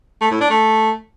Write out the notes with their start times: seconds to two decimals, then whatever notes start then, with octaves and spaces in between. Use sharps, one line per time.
0.21 A3
0.31 A2
0.41 D4
0.50 A3